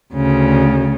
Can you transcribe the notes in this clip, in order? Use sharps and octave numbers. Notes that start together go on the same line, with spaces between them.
D2 C#3